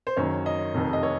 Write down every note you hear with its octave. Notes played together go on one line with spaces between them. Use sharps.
C5
F#1 F#2 D#3 C#5
D#5
F1 F2 C3 D#3
D#5
C#5